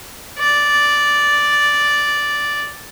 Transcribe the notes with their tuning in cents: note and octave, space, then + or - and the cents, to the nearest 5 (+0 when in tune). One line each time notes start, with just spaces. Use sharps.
D5 -5